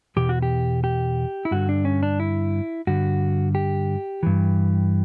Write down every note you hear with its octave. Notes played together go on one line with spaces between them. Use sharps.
E2 B2 G4
F#4
G4
G4
E4
G2 D3 F#4
D4
C#4
D4
E4
G2 D3 F#4
G4
G2 E3